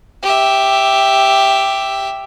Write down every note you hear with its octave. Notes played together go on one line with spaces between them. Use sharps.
G4 E5